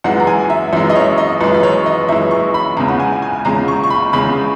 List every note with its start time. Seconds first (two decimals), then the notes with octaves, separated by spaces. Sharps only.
0.04 F#2 E3 G#3 F#5
0.20 A#5
0.27 G#5
0.50 E5
0.73 F#2 E3 G#3 E5
0.90 D#5
0.96 C#5
1.18 D#5
1.41 F#2 E3 G#3 B4
1.54 B4
1.63 C#5
1.86 D#5
2.09 F#2 E3 G#3 E5
2.31 C#6
2.54 B5
2.77 E2 C#3 G#3 A#5
2.88 F#5
3.00 G#5
3.22 G#5
3.45 E2 C#3 G#3 A#5
3.68 C#6
3.83 C#6
3.90 B5
4.13 E2 C#3 G#3 B5